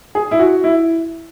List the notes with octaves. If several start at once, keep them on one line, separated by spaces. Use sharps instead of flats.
G#4
E4
F#4
E4